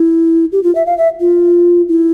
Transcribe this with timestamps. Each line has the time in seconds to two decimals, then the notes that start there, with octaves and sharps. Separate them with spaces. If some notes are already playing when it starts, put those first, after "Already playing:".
Already playing: E4
0.52 G4
0.63 F4
0.75 E5
0.86 F5
0.98 E5
1.20 F4
1.89 E4